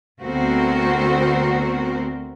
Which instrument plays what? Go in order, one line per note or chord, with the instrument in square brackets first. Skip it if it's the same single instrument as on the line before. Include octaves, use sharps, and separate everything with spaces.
[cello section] D2 B3 C4 F#4 A#4 C5